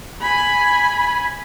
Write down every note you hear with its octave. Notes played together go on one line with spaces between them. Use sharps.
G#5 B5